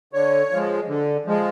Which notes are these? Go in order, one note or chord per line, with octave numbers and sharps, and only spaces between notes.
D3 C#5
F3 G#3
D3
F3 G#3